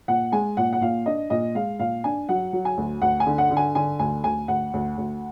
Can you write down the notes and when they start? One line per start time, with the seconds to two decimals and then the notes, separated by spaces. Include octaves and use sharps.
0.08 A#2 F#5
0.32 G#3 G#5
0.57 A#2 F#5
0.73 F#5
0.81 A#2 F5
1.06 D4 D#5
1.30 A#2 D#5
1.55 G#3 F5
1.79 A#2 F5
2.04 D4 G#5
2.29 F#3 F#5
2.53 F#3
2.65 G#5
2.77 D2
3.02 D2 F#5
3.20 G#5
3.26 D3
3.38 F#5
3.51 D3
3.57 G#5
3.75 D3 G#5
3.99 D2 G#5
4.24 D2 G#5
4.48 D2 F#5
4.74 D2
4.98 D2